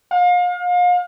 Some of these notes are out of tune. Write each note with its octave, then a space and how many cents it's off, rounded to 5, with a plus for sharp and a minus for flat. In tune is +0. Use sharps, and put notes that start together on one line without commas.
F5 +35